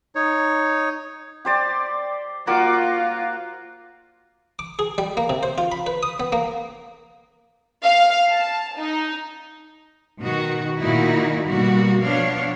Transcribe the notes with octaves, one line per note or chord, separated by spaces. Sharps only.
D#4 C#5
G4 C5 D5
A#3 F4 F#4 D6
D6
G#4
G3
A#3
C3
C5
F4
B5
B4
D#6
B3
A#3
F5
A5
D#4
B2 D#3 D#4 F#4
A#2 D#3 A#3 D#4 E4 F#4
B2 G3 A#3 F#4
F3 B3 D4 C#5 F5